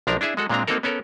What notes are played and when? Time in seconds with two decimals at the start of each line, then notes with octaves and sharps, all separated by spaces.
0.07 B1 F3 D4 A#4 A#5
0.21 D4 E4 G#4 E5
0.37 G#3 F#4 A4
0.49 A#2 G#3 C4 D4 A#5
0.67 A#3 C4 D#4 F#4 A4 A#4
0.83 B3 C#4 A4 A#4